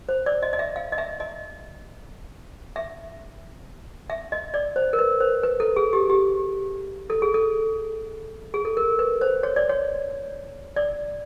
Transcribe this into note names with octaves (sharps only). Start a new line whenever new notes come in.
C5
D5
D#5
D#5
E5
F5
D#5
E5
D#5
E5
E5
D#5
D5
C5
A#4
B4
C5
B4
A4
G#4
G4
G4
A4
G#4
A4
G#4
A4
A#4
B4
C5
C#5
D5
C#5
D5